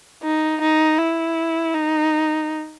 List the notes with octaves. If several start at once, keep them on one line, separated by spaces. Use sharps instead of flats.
D#4
D#4
E4
D#4